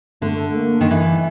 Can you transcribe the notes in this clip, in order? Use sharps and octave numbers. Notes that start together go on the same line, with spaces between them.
D3 A3
A#3
D#3
E3